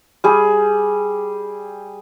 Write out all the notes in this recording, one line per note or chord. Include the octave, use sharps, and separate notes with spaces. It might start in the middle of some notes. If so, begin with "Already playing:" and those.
G3 G#4